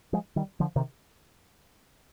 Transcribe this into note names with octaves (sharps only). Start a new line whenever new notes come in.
F3 G#3
D#3 G3
D3 F3
C3 D#3